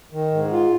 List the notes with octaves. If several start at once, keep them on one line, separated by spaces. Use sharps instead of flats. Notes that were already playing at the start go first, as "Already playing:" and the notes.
D#3
G#2
F4